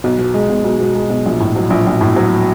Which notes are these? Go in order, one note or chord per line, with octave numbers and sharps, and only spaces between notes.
B1
B2
G#3
B1
B1
B2
G#3
B1
A#1
A2
F#3
A#1
A#1
A2
F#3